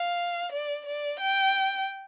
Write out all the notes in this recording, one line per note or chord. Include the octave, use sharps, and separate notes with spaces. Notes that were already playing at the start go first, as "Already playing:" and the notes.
Already playing: F5
D5
D5
G5